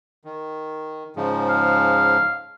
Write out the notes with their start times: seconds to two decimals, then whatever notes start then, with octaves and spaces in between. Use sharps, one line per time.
0.25 D#3
1.16 G#2 C#3 F3
1.49 F5